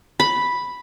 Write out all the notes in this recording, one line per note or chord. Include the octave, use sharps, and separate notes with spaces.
B5